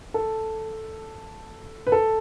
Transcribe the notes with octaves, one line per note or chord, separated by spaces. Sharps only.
A4
B4
A4